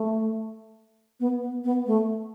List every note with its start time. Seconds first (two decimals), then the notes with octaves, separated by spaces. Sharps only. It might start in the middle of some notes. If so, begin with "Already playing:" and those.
Already playing: A3
1.20 B3
1.42 B3
1.64 B3
1.87 A3